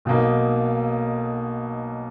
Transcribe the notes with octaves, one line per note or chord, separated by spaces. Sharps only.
B1 B2 A#3 D#4